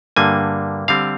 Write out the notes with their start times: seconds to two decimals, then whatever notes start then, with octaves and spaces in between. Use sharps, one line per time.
0.16 G2 D3 G3 A#3 G#5
0.88 D3 G3 C4 F5